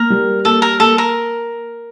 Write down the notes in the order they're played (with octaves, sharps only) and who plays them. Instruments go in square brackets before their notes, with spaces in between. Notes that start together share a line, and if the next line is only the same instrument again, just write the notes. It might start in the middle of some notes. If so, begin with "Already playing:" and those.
Already playing: [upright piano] A#3 [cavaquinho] A#4
[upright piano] G3
[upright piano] A#3 [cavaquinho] A4
[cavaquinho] A#4
[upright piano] A#3 [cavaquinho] A4
[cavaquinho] A#4